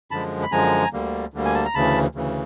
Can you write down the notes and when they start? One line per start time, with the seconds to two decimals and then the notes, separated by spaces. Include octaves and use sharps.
0.11 F#2 D3 F3 G#3 A5 B5
0.43 B5
0.52 F#2 D3 F3 G#3 G#5 A#5
0.93 D2 D3 G3 A#3
1.34 D2 D3 G3 A#3
1.45 G#5
1.54 A5
1.65 A#5
1.74 D2 C#3 E3 A5 B5
2.15 D2 C#3 E3